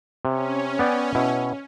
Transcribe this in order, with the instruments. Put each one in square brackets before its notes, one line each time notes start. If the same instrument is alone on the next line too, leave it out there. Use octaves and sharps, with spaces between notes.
[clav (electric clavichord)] C3 [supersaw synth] C#4
[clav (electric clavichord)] B3 D5 G5
B2 E4